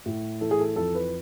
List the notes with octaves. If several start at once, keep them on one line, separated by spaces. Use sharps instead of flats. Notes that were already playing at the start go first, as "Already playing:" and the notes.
A2
E3 A4
G#4
A4
F2 A4
B4